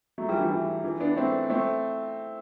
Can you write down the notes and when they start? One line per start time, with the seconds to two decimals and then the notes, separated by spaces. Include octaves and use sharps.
0.18 F#3 A3
0.28 E3 G3
0.40 E3
0.51 E3
0.84 E3
1.00 B3 D4
1.16 A3 C4
1.50 A3 C4